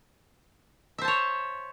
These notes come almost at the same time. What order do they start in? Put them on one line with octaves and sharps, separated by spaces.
E5 C5 A5 C#5